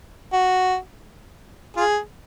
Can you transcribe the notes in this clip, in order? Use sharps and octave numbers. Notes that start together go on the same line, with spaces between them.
F#4
F4 G#4